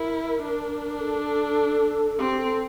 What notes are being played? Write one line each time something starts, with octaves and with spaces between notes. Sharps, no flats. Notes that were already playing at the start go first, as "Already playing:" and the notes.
Already playing: E4 A#4
D4
A4
C4 G4
A4